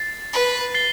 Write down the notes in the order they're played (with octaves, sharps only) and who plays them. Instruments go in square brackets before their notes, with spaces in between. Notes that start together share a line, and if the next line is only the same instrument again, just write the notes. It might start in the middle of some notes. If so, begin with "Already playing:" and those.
Already playing: [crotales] A6 C7
[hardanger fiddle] B4
[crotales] A6 C7 G7